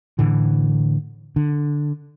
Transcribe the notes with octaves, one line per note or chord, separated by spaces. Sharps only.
A2 D3 E3
D3